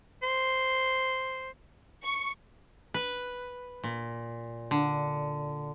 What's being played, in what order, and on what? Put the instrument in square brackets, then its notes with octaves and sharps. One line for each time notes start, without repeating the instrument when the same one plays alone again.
[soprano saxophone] C5
[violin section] C#6
[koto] B4
A#2
D3